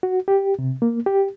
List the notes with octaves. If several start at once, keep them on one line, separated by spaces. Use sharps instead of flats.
F#4
G4
C3
A#3
G4